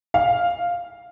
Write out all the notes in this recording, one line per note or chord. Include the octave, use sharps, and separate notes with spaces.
F5